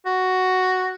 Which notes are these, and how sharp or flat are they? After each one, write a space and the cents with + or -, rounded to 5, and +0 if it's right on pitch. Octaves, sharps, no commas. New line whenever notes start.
F#4 +5